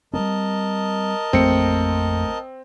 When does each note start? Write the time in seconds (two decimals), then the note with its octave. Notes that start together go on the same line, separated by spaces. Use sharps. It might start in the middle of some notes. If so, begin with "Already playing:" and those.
0.13 G3 A3 C4 A#4 D#5 A5
1.33 A1 F2 F3 A3 A#3 C4 C#7